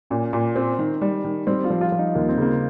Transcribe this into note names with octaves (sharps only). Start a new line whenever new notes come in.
A#2 C#4
A#2
C4
D#3
G3
D#3
G3 C4
F4
F3
F4
F3
D#4
D#2 A#3
C4
C#3 A#3